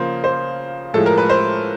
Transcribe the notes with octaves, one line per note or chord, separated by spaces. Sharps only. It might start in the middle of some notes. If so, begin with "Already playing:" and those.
Already playing: C#3 F3 A#3 C5
C5
A2 F3 G#3 A4
A#4
B4
C5